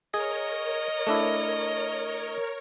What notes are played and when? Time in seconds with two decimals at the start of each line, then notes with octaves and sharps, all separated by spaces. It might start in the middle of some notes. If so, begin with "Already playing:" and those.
0.14 G#4 A#4 C#5 D#5
1.07 A3 D4 E4